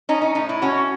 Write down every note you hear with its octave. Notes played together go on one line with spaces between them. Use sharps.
C#4 D#4
D#4
A2 D#4
E4
C#4 F#4